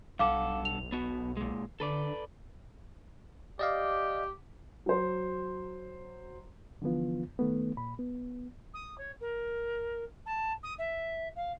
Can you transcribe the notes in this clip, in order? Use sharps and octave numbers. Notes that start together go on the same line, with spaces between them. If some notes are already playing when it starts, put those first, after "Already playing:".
B1 G2 A4 F5 F#5 D6
F7
B3 F#4
A#2 G#3
D3 A4 B4 D5
G4 D5 D#5 F5
F#3 C5
D3 E3 F3 B3 F4
D#3 A3 B3
A#2 B5
B3
D#6
C#5
A#4
A5
D#6
E5
F5